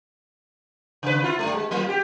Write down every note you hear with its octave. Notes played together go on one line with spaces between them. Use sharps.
C#3 B4
E4 F4
G2 A3
G#3
F#3 A#3 F4
G4